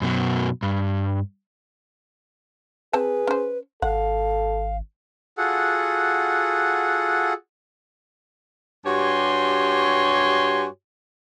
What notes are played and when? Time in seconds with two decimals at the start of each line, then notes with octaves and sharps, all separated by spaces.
0.02 F#2 B2 F#3
0.63 G2
2.93 C4 G#4 B4 A5
3.27 C#4 C5
3.82 G#1 A4 F5 F#5
5.38 F4 F#4 G#4 A4 F#5
8.85 G2 F#4 G4 C#5 G#5 C6